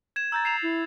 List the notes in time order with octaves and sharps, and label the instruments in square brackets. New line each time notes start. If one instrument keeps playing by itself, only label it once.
[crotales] G#6 E7
[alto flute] A#5 [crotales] E6 G6 A6
[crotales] C7 E7 F7
[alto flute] E4